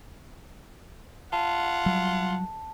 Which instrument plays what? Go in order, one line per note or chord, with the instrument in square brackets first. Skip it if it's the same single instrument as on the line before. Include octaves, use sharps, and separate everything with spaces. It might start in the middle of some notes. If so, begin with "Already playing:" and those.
[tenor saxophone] F4 [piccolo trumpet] F#5 [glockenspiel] A5
[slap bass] F#3 G3